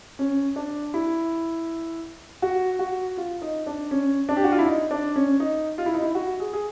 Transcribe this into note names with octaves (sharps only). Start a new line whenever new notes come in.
C#4
D4
E4
F#4
F#4
F4
D#4
D4
C#4
D4
G4
F#4
F4
E4
D#4
D4
C#4
D#4
F4
E4
D#4
E4
F#4
G#4
G#4